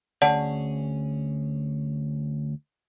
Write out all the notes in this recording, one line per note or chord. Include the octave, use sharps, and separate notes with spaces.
D2 C#4 G#4 D5 F#5 A5